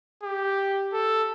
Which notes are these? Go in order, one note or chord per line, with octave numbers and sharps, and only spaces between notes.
G4
A4